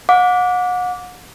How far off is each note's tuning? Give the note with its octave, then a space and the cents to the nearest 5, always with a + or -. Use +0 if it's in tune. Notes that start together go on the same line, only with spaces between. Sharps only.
F#5 -35 D6 -15